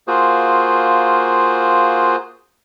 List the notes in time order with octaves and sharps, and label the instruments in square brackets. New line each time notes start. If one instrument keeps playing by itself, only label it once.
[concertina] A#3 F4 F#4 G#4 C5